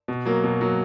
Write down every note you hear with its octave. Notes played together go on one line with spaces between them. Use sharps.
B2
F#3 A#3
B2
F#3 A#3